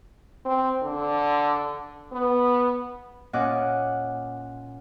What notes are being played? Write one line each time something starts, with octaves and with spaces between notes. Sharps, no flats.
C4
D3
B3
A#2 C#4 D#5 F#5 D6